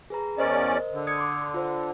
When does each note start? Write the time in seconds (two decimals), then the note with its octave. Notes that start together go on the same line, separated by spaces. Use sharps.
0.10 G#4 B4 A#5
0.38 E2 C#4 A#4 C5 D5 D#5
0.93 D3
1.07 D#6 G#6 C#7
1.18 C6 D6
1.54 F4 C5